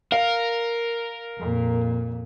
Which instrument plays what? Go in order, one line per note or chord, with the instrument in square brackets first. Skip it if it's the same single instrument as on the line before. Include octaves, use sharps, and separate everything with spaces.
[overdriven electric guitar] A#4 [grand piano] F5
[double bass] F2 A#2